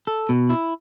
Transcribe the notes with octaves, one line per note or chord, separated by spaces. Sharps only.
A4
B2
E4